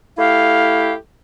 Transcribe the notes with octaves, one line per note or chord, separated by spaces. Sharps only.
A3 E4 G4 F5